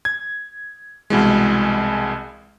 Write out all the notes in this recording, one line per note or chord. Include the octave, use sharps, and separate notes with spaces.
G#6
C2 B2 E3 G#3